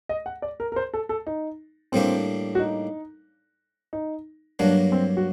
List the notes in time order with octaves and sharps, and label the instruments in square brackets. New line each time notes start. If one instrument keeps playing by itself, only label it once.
[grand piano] D#5
F#5
D5
A#4
A#4
C5
A4
A4
D#4
[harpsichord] A2 G3 A#3 D4 [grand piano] C4
[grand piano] F#4
D#4
D#4
[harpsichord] G2 F#3 A#3 [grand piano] D4
[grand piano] C4
F#4